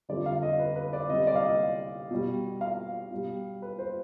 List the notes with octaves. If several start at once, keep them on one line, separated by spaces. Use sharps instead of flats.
F2 D3 G3 D5
F5
D#5
B4
B4
D5
C3 G3 D#5
D5
F5
D#5
B2 G3
F5
B2 G3
B4
C5